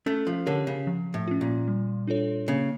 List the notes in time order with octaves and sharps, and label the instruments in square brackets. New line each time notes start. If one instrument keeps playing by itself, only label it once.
[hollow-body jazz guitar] A3 [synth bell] C#4
[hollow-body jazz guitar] F3
[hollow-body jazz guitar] D3 [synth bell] G4 A#4 C#5
[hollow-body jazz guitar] C#3
[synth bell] F3
[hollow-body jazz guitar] A2
[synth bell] C#4 F4
[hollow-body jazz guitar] A#2
[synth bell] G3
D4 F4 A4 C#5
[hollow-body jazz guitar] C#3 [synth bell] A#3